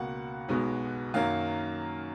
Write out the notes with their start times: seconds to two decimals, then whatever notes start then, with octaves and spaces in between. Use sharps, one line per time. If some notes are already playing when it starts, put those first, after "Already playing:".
Already playing: C#2 B2 A#3 F#5
0.49 B1 B2 G#3 B3
1.14 F#2 D#3 F#3 A#3 F5